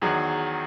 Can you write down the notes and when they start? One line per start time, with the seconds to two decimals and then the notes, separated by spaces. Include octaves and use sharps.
0.02 E2 D#3 F#3 G#4